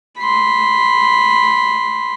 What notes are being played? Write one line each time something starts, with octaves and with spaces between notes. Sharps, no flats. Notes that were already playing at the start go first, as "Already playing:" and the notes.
B5 C6